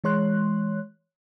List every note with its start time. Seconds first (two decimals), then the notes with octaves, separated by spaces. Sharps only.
0.04 E3 G#3 C#5 C6 F#6